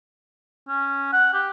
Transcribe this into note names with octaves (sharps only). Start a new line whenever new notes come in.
C#4
F#5
G4